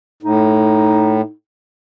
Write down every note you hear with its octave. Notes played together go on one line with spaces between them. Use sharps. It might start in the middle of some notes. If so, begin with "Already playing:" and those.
A2 D#4